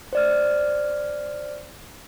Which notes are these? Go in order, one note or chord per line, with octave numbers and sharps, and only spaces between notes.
C5 D5 F6